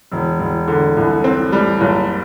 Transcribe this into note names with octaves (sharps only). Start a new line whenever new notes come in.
E1
E1
D3
C2
C4
G3
F#1